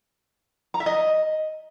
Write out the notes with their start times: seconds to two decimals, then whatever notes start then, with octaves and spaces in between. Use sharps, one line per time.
0.74 A#5
0.80 E5
0.86 D#5